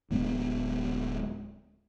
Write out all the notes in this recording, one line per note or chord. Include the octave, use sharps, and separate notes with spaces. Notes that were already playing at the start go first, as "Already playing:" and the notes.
D1 G#3 B3 D4